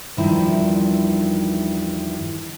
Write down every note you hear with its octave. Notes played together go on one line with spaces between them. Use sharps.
E2 G2 D#3 F3 E4